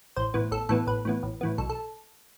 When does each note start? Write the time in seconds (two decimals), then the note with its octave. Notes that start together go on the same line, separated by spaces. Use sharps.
0.16 A1 C5
0.34 A2 E3 B3
0.51 A1 A4
0.69 A2 E3 B3 A4
0.87 A1 B4
1.05 A2 E3 B3
1.23 A1
1.41 A2 E3 B3
1.58 B1 A4
1.69 A4